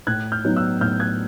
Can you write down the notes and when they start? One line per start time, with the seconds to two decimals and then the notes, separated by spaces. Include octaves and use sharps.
0.07 A2 F#6 G#6
0.32 F6 G6
0.44 F#3 B3 D#4
0.56 E6 F#6
0.81 A2 F6 G6
1.00 F#6 G#6